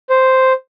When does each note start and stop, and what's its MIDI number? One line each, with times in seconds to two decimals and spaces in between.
0.10 0.53 72